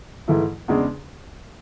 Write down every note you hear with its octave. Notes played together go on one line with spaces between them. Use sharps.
G#2 E3 A3 E4
E2 C#3 G#3 D4